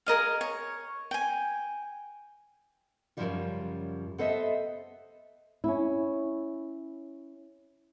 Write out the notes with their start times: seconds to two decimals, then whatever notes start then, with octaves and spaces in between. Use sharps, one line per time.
0.06 G#4 A#4 D#5 F5
0.41 C#5
1.11 G5 G#5
3.17 F#2 A#2 C#3 F3 G3 F4
4.18 B3 A4 C5 D#5 E5
5.64 C#4 E4